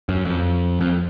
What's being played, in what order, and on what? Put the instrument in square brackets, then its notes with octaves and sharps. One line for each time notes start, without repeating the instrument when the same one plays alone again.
[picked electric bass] F#2
F2
F2